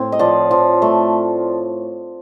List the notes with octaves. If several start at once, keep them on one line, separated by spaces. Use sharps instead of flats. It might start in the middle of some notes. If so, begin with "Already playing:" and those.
Already playing: A2 C4
D#5
F3 D5
F3
A3